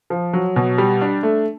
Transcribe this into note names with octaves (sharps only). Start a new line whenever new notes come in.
F3
F#3
B2
G3
D4
A3